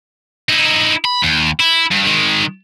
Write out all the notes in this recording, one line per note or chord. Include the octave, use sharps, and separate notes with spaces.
D#4 E4
B5
D#2
E4
G2
D#3 G#3